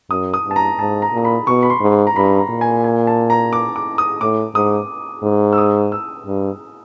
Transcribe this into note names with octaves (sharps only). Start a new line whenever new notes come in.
F#2 D#6
D#6
G2
A5
A#5
G#2 A5
A#5
A#2 A#5
B5
B2 C#6
B5
C6
G#2
A#5
G2 B5
A#5
A#2
G#5
G#5
A5
A#5
D6
D6
D#6
A2 D6
G#2 D#6
G#2
E6
D#6
E6
G2